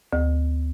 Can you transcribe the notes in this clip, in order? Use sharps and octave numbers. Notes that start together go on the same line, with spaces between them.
D2